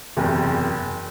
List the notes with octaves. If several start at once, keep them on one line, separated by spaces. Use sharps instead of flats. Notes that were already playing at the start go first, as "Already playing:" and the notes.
F#1 E2 C3